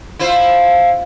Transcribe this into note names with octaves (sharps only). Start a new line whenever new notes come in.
E4 F4 C5